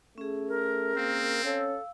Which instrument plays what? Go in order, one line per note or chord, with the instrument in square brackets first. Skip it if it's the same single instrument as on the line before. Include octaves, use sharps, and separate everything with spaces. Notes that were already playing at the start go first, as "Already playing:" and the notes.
[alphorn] A3 [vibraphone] C#4 G#4
[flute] A#4
[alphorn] A#3 [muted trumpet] C4
[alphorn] C#4 [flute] A4 [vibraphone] F5 E6